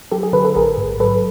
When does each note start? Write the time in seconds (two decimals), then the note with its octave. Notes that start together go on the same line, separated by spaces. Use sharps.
0.12 F#3 G4 A4
0.23 G#4
0.33 D3 A4 B4
0.45 A4 B4
0.56 A1 G#4 A#4
0.78 G#2
1.00 F#3 A4 B4